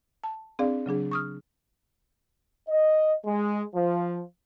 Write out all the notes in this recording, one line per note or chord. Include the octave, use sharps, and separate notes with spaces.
A5
C4 D4 G#4 D5 F5
C#3 F#3 D4 G#4
C#6 D#6 F6
D#5
G#3
F3